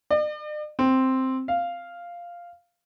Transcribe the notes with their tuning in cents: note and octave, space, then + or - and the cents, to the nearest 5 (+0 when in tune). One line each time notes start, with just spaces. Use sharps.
D5 +45
C4 +0
F5 -5